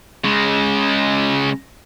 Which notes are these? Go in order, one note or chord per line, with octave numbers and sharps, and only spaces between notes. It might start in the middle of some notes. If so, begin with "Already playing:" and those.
C#3 G#3